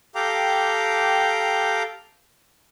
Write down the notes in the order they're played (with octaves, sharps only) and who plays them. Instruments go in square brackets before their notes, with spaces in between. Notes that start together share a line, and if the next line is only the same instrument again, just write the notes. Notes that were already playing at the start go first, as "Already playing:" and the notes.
[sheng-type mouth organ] G4 A4 F5 G5 A#5 D6